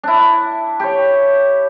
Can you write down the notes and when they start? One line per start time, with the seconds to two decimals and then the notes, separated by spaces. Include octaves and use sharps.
0.03 D4 E4
0.80 G4 C#5